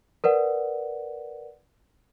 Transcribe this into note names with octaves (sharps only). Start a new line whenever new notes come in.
A#4 B4 D5 F#5